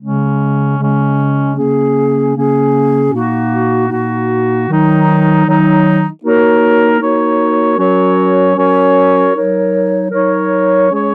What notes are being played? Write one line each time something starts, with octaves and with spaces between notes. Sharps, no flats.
C#3 G#3 C#4
C#3 G#3 C#4
C#3 A#3 C#4 G#4
C#3 A#3 C#4 G#4
A#2 A#3 D#4 F#4
A#2 A#3 D#4 F#4
D#3 F#3 D#4
D#3 F#3 D#4
A#3 D#4 F#4 A#4 C#5
A#3 D#4 F#4 A#4 C#5
F#3 C#4 F#4 A#4 C#5
F#3 C#4 F#4 A#4 C#5
F#3 D#4 A#4 C#5
F#3 D#4 A#4 C#5
G#3 C#4 G#4 C#5